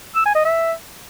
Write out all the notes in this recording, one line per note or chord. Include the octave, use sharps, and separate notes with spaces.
E6
G#5
D#5
E5